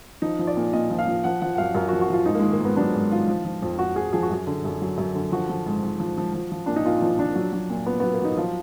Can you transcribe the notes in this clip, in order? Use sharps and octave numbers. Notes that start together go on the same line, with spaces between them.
F3 D#4
F3
D5
A#2
A#2 D#5
F3
F5
F3
F3 F#5
F3 F#5
F#5
F#2 F5
F#2 A#4
F#4
F3
F#4
F3 F4
G#2 D#4
A#3
D#3 G#3
A#3
G#2
B3
F#3 D4
G#2
D#3 F4
F3
F3
F2
F2 F#4
F3 G#4
F3 G#4
F#4
F#2 G#4
D3
F#2
F#3
F#2
D3
F3 F#4
F3
G#2
G#2
F3
F3
F3
F3
A#2 D4
D#4
A#2 F4
F3 D#4
F3 D4
F#3
F#3
A#2
A#2 B3
F#3 B3
A#3
F#3 D#4
F3 F4